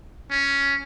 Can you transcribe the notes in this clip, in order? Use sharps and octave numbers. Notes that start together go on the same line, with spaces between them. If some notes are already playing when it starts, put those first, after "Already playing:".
C#4